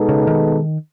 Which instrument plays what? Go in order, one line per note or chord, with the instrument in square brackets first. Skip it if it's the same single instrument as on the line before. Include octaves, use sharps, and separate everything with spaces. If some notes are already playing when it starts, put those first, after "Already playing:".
Already playing: [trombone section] B2 G#3 B3 D#4 A4
[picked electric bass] C#3
D#3